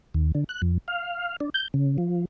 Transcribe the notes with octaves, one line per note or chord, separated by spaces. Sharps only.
D#2
D3
F#6
F2
F5
D4
G6
C#3
F3